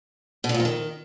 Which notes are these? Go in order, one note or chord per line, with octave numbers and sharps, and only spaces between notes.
B2
D3
A#2
F2
D#3